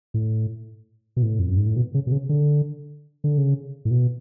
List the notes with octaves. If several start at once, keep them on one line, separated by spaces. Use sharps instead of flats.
A2
B2
A2
F2
F#2
G#2
A2
B2
C#3
B2
C#3
D3
D3
C#3
A2
B2